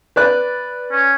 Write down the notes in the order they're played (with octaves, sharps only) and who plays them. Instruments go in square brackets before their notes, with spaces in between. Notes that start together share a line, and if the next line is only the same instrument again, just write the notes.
[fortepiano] B4 D5 F#6
[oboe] C#4